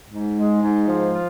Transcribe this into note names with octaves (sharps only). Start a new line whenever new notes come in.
G#2
G#3
G#2
F3
F4